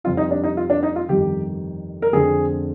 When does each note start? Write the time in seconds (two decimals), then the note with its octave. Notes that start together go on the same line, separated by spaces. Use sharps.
0.04 F2 C3 G3 C4 F4
0.17 D#4
0.31 D4
0.44 D#4
0.57 F4
0.70 D4
0.83 D#4
0.96 F4
1.09 G1 F2 C3 D#3 G4
2.02 A#4
2.13 F1 F2 D3 G#3 C4 G#4